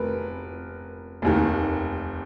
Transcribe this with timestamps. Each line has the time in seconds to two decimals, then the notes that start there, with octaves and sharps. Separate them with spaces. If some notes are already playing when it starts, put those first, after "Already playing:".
Already playing: F1 A#4 B4
1.22 F1 D#2 D#3